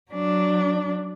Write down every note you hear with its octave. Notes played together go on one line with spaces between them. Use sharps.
F#3 D4